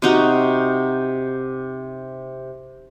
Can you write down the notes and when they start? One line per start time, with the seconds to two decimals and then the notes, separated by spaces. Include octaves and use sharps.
0.02 C3 D#4 F#4